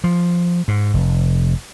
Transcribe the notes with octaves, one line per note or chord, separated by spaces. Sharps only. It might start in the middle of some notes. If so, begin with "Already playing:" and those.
F3
G#2
F1